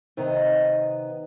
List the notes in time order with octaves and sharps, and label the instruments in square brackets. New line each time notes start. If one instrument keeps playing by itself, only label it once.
[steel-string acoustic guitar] C3 D#3 B3 D#5 A#5